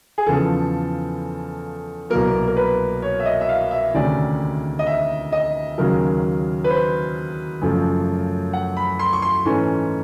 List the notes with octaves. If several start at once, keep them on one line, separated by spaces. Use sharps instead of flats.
G#4
E2 C#3 F3 A4
C2 B2 F#3 A#3 A#4
A#4
B4
C#5
E5
D#5
E5
F5
E5
D2 C3 D#3 G#3 C#4 D5
D#5
E5
D#5
D#2 C#3 F#3 A#4
B4
C5
F#2 C#3 F3 A3
F#5
B5
C6
C#6
C6
G#2 E3 A3 C#4 C#6